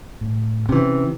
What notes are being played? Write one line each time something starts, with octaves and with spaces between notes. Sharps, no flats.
A2
C3 E3 C#4